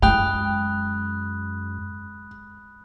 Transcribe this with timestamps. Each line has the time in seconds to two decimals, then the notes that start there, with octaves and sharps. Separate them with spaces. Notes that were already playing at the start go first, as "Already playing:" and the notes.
0.02 F#2 G#3 G5 B5 D#6 F#6